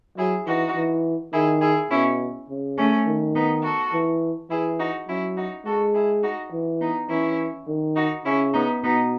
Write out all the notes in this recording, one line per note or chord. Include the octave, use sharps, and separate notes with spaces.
F#3 E4 G#4
E3 D#4 F#4
E3
D#3 E4 G#4
E4 G#4
B2 C#4 E4
C#3
A3 C#4
D#3
B3 D#4
F#4 A4
E3
E3 E4 G#4
D#4 F#4
F#3 C#4 E4
D#4 F#4
G#3 F#4 A4
E4 G#4
D#4 F#4
E3
B3 D#4
E3 C#4 E4
D#3
D#4 F#4
C#3 C#4 E4
B3 D#4
B2 B3 D#4